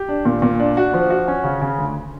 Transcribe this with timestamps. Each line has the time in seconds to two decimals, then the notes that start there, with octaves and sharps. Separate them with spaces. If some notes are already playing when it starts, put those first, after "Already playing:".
Already playing: G4
0.09 D4
0.25 A#2
0.42 A#2
0.60 D4
0.77 F#4
0.94 F3
1.10 F#4
1.28 C#4
1.44 C#3
1.61 C#3
1.78 D2